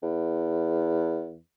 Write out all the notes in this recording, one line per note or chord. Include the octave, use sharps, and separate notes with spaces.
E2